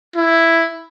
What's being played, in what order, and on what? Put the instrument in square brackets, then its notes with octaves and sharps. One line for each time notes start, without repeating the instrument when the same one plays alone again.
[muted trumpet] E4